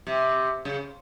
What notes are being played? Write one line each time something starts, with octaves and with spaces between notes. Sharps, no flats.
C3
C#3